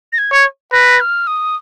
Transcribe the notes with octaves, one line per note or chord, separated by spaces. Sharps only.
A#6
G#6
C#5
B4 A#6
F6
D#6